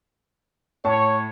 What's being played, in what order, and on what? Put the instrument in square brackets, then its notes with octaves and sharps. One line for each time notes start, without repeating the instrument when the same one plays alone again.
[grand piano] A2 A5 C#6 [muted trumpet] C#5